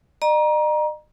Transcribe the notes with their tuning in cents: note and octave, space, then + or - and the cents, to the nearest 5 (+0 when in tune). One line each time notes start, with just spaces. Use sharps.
D#5 -45 A#5 +25